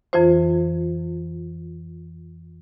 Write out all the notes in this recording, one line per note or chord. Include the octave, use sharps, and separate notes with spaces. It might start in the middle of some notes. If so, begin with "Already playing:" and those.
F2 E3 F4 C5